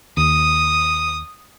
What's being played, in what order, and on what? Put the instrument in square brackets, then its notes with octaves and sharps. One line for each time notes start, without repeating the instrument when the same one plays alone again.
[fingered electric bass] D#2 [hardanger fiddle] D#6